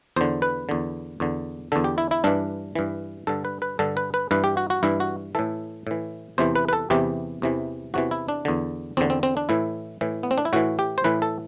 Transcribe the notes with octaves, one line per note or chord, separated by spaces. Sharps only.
E2 D3 C5
B4
E2 D3
E2 D3
E2 D3 A4
G4
E4
E4
G2 E3 D4
G2 E3
G2 D3 A4
B4
B4
G2 D3 A4
B4
B4
G2 E3 B4
G4
F#4
F#4
G2 E3 E4
F#4
A2 E3 A4
A2 E3
E2 C3 E3 C5
B4
B4
A4
E2 C3 E3 G4
E2 C3 E3
E2 C3 E3 F#4
E4
D4
E2 D3
E2 D3 C4
C4
C4
D4
A2 E3 E4
A2 E3
B3
C4
D4
E4
A2 E3 F#4
G4
C5
A2 E3 B4
A4